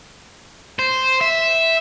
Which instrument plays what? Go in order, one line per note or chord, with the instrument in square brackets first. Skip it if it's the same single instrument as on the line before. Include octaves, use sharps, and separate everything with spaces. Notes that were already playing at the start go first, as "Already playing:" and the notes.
[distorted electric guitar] C5
E5